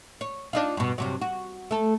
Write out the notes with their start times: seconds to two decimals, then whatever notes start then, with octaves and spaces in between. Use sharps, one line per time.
0.21 C#5
0.53 D4 D#4 F4
0.77 G2 B2
0.98 G2 C3 F#3
1.21 F#4
1.71 A3 A4